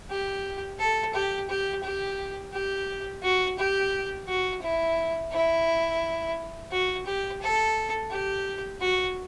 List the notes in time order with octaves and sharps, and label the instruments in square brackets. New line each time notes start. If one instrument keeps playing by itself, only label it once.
[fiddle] G4
A4
G4
G4
G4
G4
F#4
G4
F#4
E4
E4
F#4
G4
A4
G4
F#4